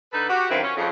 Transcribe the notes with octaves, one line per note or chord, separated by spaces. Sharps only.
D3 D#4 A4 B4
F#4 G4
F#2 D#3 C4 E4 F4 B4
C#4
F2 C#3